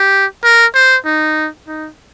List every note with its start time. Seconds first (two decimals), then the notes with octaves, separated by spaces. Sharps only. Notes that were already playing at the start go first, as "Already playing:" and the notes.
Already playing: G4
0.44 A#4
0.75 C5
1.06 D#4
1.68 D#4